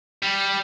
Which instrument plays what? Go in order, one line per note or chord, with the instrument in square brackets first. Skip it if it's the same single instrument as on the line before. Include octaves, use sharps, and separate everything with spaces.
[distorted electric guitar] G3